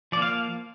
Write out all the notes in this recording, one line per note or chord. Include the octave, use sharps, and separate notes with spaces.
F3 A#3 D5
F5